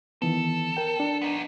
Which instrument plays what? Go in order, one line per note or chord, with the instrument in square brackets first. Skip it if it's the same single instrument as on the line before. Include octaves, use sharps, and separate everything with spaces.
[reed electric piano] D#3 E3 B3 [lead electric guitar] A4
[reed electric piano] A#4 G5
D4
[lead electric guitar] B3 D#4